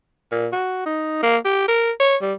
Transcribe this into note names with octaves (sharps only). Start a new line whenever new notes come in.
A#2
F#4
D#4
A#3
G4
A#4
C#5
G3